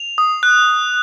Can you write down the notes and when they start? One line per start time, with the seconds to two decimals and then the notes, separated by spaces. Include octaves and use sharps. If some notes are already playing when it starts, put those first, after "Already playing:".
Already playing: F7
0.18 D#6
0.43 F#6